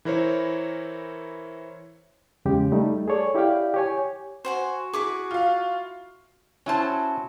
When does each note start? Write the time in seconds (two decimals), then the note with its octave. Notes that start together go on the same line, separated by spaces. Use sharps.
0.05 E3 E4 A#4 C5 C#5
2.45 E2 C#3 G#3 G4
2.72 G3 A3 D#4
3.08 G#4 A4 C#5 D5
3.35 E4 G4 D5 F5 G5
3.74 G4 C#5 G#5
4.45 F#4 C5 F#5 G#5
4.93 E4 G#4 C#6 D6
5.31 F4 F5
6.66 F#3 C#4 E4 C5 A5